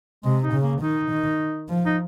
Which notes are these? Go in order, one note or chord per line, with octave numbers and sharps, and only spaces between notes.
C3 G#3
D#4
C#3
A#3
D#3 D#4
D#3
F3
D#4